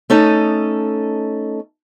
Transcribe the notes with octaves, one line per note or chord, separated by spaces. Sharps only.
A3 C#4 D#4 A4 D#5